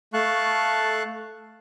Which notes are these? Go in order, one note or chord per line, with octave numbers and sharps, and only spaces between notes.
A3 F5 A5 C#6 F#6